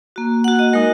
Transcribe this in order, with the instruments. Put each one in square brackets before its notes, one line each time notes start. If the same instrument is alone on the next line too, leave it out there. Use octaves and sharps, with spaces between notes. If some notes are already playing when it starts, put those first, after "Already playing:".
[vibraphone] A#3 F#4
A#3 F#4 F#5
D#5
G#3 D#4 F#4 A#4